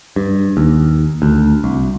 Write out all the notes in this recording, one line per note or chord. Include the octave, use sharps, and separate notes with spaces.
G2
D#2
D2
C2